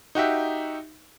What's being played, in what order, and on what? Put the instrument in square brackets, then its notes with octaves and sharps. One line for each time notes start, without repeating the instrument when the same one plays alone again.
[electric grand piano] D#4 F#4 G4 E5